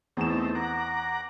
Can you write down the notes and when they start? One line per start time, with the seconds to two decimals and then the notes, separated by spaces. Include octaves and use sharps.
0.17 E2 A3 C4 D#4 E7
0.55 F#5 A#5 D6